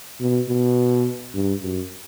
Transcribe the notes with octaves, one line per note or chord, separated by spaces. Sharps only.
B2
B2
G2
F#2